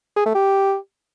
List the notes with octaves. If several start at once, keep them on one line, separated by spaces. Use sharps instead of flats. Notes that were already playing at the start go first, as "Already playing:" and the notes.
G#4
A3
G4